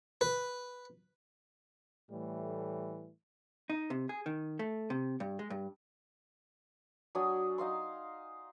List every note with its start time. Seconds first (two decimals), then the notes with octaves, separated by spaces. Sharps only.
0.21 B4
2.10 A2 E3 G3 A3
3.70 D#4
3.90 C3
4.09 G#4
4.26 D#3
4.59 A3
4.90 C3
5.20 G2
5.39 G#3
5.50 G2
7.15 F#3 D4 G#5 D#6
7.58 D#4 D#5 F5 C6